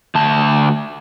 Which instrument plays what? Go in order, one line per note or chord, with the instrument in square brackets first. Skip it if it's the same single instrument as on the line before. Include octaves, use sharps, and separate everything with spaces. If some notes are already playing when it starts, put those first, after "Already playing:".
[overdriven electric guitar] D2 A5